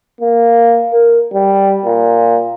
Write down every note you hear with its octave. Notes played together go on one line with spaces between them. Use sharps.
A#3
A#4
G3
A#2